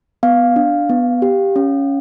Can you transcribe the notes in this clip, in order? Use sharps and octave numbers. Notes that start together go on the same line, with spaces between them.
B3 F5
D4
B3
G4
C#4